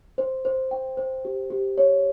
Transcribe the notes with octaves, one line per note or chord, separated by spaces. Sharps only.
C5
C5
G5
C5
G4
G4
C#5